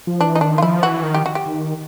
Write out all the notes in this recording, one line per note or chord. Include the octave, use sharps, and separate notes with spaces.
F3
E3 D4
D#4
D#3 D4
F4
F3 E4
E3 F#4
D#3
G4
F#4
G4
D#3